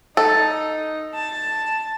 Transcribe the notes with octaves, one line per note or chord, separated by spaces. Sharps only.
D#4 A4
A5